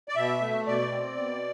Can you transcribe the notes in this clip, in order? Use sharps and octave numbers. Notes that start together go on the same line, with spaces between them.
D5
B2 E5
A3
B2 D5
C4
B2